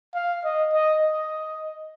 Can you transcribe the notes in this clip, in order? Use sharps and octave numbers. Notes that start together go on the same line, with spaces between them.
F5
D#5
D#5
D#5